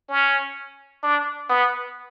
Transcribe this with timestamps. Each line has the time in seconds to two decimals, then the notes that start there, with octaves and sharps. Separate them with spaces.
0.09 C#4
1.03 D4
1.49 B3